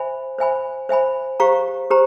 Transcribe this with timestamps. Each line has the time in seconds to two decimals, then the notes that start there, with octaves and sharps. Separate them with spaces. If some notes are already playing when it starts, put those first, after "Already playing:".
Already playing: C5 E5 G#5 B5
0.39 C5 E5 G#5 B5
0.89 C5 E5 G#5 B5
1.40 G4 C5 F5 A#5 C#6
1.90 G4 C5 A#5